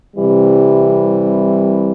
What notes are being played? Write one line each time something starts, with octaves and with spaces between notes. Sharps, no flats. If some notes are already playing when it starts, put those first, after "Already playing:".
C2 C3 E3 G3